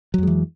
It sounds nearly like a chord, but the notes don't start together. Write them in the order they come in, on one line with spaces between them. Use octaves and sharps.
F#3 F2 G#3 E3